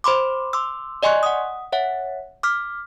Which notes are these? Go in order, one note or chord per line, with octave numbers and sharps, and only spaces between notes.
C5 B5 C6 D6
C6 D6 E6
D5 D#5 G#5 C6 C#6 F#6
F#5 D#6
C#5 E5 F#5
D6 F6 B6